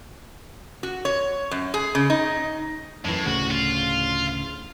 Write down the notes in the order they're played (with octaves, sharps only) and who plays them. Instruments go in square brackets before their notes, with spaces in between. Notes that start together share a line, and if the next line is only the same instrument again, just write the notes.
[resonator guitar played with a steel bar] F#4
C#5
F#2
G#4
C#3
D#4
[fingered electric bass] F#2 E3 [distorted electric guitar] A2
[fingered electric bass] D2 A2 C#3 [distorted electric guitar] F#4
[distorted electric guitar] F4